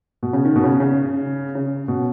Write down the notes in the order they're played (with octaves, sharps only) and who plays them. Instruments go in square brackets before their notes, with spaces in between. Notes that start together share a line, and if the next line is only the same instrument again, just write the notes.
[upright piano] B2
C#3
D#3
B2
C#3
C#3
C#3
B2